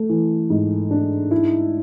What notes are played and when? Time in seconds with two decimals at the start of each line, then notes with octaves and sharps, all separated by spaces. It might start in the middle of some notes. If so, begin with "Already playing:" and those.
Already playing: A3
0.10 E3
0.50 G#2
0.91 D4
1.31 E4